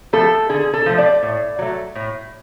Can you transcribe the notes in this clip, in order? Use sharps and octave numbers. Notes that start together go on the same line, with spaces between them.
F3 A3 A4
D3 G#4
A4
F3 A3
D5
A2
F#3 A3
A2